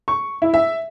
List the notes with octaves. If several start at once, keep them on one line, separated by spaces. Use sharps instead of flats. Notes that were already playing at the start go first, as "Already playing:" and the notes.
C#6
E4
E5